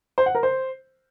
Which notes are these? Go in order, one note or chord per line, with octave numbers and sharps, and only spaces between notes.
C5
F#5
A#4
C5